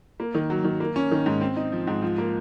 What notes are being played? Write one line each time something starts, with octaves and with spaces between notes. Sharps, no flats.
A#3
D#3
F#3
D#3
A#3
C#4
D#3
G#2
C4
D#4
F3
G#2
F3
A#3